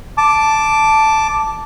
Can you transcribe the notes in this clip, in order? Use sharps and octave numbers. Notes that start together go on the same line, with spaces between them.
A5 D6